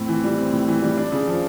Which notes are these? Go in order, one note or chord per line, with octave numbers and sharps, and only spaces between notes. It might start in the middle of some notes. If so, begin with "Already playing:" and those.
Already playing: A2 C4
E3
G3
C4
A2
E3
G3
D4
C#3
F3